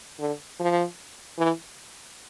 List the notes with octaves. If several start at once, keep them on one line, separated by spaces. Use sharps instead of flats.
D3
F3
E3